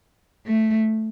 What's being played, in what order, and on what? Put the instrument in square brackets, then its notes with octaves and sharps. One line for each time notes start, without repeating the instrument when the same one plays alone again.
[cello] A3